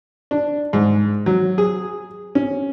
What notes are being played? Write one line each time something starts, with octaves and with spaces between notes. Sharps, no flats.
D4
G#2
F#3
G#4
C#4